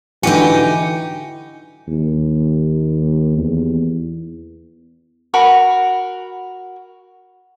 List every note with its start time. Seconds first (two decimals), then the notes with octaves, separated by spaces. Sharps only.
0.23 D3 E3 D#4 F#4 G4 G#5 C#7 D#7
1.88 D#2
3.37 E2
5.34 F#4 A#4 B5